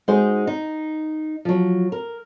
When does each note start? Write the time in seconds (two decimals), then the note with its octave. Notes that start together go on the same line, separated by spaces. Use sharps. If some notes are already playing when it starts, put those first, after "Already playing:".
0.08 G#3 D#4 F#4 G#4 C5
0.47 D#4
1.45 F3 F#3
1.92 A#4